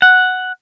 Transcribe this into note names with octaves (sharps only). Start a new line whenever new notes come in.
F#5